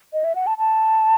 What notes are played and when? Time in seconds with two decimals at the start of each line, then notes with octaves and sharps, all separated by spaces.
0.13 D#5
0.24 E5
0.35 F#5
0.47 A5
0.58 A5